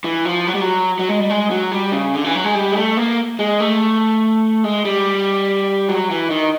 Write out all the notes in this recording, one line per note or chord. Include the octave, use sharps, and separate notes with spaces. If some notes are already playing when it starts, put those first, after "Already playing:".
E3
F3
F#3
G3
F#3
F#3
G#3
G3
G#3
F#3
G3
C#3
D3
E3
F#3
G#3
G3
G#3
A3
A#3
G#3
A3
G#3
G3
F#3
E3
D#3